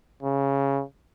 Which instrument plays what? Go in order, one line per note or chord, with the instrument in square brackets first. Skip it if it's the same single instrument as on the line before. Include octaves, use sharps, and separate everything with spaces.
[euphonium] C#3